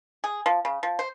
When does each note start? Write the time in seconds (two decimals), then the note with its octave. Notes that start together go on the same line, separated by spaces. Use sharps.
0.24 G#4
0.46 F3
0.65 C#3
0.83 F3
0.99 C5